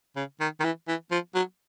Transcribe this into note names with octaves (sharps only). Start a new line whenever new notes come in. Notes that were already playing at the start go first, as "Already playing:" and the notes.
C#3
D#3
D#3
E3
E3
F3
F#3